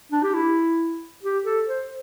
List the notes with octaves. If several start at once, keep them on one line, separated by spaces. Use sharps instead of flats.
D4
G4
E4
G4
A4
C5